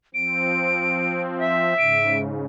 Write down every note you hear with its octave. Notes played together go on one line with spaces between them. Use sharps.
F3 C4 D7
E5
G#2 C#3 D7